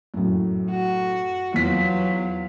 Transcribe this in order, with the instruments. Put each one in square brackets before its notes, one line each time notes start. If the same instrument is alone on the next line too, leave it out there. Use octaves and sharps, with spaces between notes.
[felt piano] F#2 A2
[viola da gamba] F#4
[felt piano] E2 B6 [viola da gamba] F3 F#3